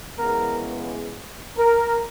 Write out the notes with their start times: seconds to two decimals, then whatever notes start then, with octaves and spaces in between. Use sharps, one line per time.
0.19 C#3 E3 G#3 B3 A#4
1.57 A#4